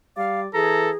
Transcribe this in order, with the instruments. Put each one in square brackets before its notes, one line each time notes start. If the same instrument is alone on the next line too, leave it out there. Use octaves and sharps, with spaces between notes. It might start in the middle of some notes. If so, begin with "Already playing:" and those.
[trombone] G3 [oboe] D5 [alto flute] F5
[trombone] E3 [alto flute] G#4 [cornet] A4 [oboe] A#5